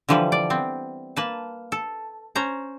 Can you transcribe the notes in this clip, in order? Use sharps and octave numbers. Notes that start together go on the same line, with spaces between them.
D3 E3 F3 G3 B4
D5
B3 C4
A#3 B4 A5
A4
C#4 C5 A#5